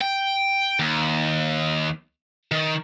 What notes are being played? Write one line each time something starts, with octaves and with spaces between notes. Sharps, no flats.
G5
D#2
D#3